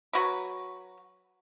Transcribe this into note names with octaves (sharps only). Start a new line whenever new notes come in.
F#3 F#4 B4 B5